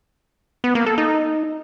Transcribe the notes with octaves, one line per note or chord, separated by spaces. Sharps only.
B3
A#3
A4
D#4